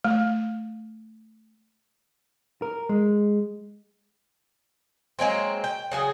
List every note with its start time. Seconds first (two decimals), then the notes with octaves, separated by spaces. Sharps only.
0.04 A3
2.62 A#4
2.89 G#3
5.19 F#3 G#3 A#3 C4
5.64 G5
5.91 C#3 F#3 G#4